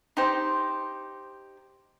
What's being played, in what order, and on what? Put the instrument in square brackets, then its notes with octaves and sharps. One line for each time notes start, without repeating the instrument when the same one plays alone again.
[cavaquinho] D#4 G4 C5